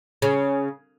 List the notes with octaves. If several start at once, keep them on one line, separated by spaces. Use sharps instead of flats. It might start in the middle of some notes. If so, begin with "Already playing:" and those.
C#3